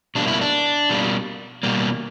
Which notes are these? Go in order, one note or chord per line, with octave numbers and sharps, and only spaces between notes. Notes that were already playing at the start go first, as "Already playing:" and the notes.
B2 G3 A#3 D4
E4
D4
B2 G3 A#3
B2 G3 A#3